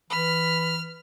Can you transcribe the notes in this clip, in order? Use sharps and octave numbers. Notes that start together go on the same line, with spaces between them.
E3 B5 F6